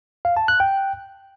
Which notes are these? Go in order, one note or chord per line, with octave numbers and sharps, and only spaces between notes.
F5
A5
F#6
G5